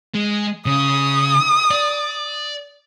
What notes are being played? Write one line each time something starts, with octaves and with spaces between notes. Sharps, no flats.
G#3
C#3 D#6
D5